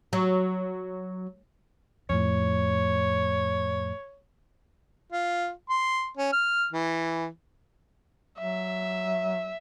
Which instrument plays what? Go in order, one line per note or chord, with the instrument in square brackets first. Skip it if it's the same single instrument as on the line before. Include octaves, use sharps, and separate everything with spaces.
[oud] F#3
[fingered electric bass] F2 A2 [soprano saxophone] C#5
[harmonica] F4
C6
C#4
F6
E3
[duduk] F#3 [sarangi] E5